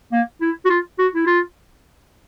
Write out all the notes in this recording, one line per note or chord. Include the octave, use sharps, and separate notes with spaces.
A#3
E4
F#4
F4
F#4
E4
F4